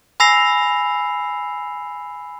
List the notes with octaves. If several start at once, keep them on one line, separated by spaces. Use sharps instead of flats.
G#5 B5 E6 A#6 C7 F7